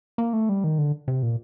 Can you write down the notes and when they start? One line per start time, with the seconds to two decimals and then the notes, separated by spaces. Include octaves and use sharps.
0.18 A#3
0.33 A3
0.49 G3
0.64 D#3
0.78 D3
1.08 C3
1.23 A#2